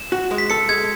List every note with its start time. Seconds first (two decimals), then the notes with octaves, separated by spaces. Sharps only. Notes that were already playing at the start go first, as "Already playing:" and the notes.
Already playing: E7
0.12 F#4
0.31 G#3
0.38 B6
0.50 A4 C#7
0.69 G#3 G#6